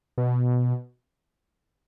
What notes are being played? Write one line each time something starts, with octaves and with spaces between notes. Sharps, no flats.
B2